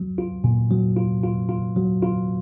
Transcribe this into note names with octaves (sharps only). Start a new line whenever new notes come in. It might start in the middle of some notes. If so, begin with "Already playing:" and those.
Already playing: F#3
F4
A#2
F#3
F4
F4
F4
F#3
F4